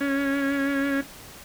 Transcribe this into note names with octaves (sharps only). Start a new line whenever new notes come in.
C#4